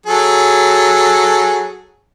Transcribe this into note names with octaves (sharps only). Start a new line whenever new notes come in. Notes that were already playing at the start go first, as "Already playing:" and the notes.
F#3 G#4 A4